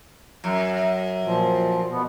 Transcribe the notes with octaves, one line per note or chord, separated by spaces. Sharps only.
F#2
A#2 F3
B2 B3